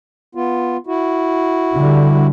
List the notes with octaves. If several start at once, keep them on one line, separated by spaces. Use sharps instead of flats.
B3 F4
E4 F#4
D3 G3